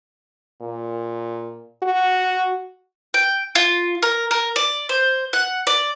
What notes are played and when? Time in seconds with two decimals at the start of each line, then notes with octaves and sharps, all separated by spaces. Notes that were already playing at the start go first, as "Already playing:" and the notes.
0.61 A#2
1.83 F#4
3.14 G5
3.55 F4
4.03 A#4
4.31 A#4
4.56 D5
4.89 C5
5.33 F#5
5.67 D5